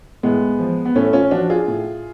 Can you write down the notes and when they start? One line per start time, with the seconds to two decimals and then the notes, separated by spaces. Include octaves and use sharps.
0.23 A2 G#3 B3
0.59 F3
0.85 B3
0.95 A2 A3 C#4
1.13 C#4 F4
1.31 F3 D4 F#4
1.50 F4 G#4
1.68 A2